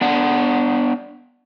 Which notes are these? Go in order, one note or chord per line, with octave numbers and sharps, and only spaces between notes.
B3 D4 F#5